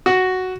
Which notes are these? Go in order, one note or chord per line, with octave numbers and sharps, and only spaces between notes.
F#4